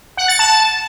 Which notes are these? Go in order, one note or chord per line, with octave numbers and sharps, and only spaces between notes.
F#5
A6
A5